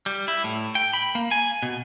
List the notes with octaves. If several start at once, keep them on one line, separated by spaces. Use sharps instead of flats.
G3
E4
A2
G5
B5
A#3
G#5
B2